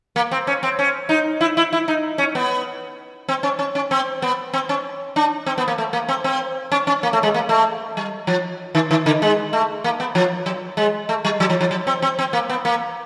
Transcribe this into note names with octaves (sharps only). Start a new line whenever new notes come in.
A#3
C4
C#4
C4
C#4
D#4
E4
E4
E4
D#4
C#4
B3
C4
C#4
C#4
C#4
C4
B3
C4
C#4
D4
C4
B3
A#3
A3
A#3
C4
C4
C#4
C#4
A#3
A3
G#3
A#3
A3
G3
F3
D#3
D#3
D3
G#3
A3
A#3
B3
F3
F#3
G#3
A3
G3
F#3
F3
F3
F#3
C4
C4
C4
A#3
B3
A#3